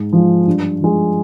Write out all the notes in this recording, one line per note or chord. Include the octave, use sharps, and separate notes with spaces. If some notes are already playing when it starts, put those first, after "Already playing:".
Already playing: G#2
F3 G#3
G2
F3 G#3